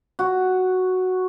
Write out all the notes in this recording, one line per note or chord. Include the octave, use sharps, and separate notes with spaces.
F#4